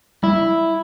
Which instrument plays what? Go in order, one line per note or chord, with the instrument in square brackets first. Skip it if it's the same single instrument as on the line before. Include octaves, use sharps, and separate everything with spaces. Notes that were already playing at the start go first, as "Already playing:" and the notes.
[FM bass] G3 [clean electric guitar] E4